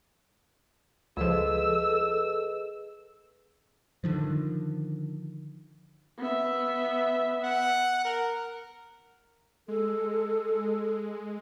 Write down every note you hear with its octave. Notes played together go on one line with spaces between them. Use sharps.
C#2 F3 G#4 A4 B4 D#5 E6
D3 D#3 F3
B3 E5
F#5
A#4
G#3 A4